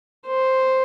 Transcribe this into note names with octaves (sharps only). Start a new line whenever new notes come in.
C5